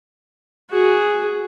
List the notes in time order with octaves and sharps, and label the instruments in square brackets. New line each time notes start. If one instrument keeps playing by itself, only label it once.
[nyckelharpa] F#4 G#4